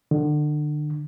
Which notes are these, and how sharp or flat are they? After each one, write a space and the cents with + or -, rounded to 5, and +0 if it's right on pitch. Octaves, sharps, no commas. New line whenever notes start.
D3 +30